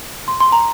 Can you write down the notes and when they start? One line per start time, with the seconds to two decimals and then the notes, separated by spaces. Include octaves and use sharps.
0.28 C6
0.40 C6
0.52 A#5